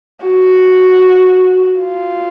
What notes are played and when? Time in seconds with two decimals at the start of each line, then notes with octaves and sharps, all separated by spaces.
0.24 F#4
1.80 F4